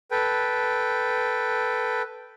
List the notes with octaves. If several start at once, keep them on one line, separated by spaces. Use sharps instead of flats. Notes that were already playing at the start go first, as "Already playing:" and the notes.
A4 B4 G5